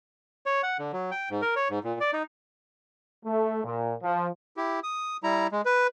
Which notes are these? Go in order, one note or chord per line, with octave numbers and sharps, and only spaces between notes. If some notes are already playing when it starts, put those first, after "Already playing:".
C#5
F#5
D3
F#3
G5
G#2
A#4
C#5
G#2
A#2
D5
D#4
A3
A#2
F3
E4 G4
D#6
G3 E4 A#5
G#3
B4